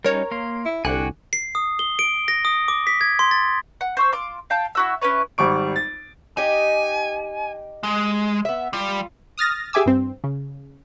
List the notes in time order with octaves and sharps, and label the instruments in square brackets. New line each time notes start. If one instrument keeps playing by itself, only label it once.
[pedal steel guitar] G3 C#4 D#4 [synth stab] A#4 C#5 A#5
[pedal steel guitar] A#3 F5 C6
[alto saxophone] E4
[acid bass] C2 [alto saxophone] D3 [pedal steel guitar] F#4 G5 G#5 [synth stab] F#6
[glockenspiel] C7
D#6
G7
D7
A#6
D#6
D6
B6
G#6
C6
A6
[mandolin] F#5
C5 C#6 E6
F4 C6 D6
F5 G5 A5
E4 F#4 E6
C#4 E4 B4 C#5
[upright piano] G#1 G3 C#6 D7
A6
[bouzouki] D#4 G4 D#5 [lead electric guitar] G#5
[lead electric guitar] G#3
[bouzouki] B3 E5
[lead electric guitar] G3 [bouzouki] F4
[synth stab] D#6 F6 A6 A#6
G4 G#4 E5 G#5 D6 E6
G2 C4
C#3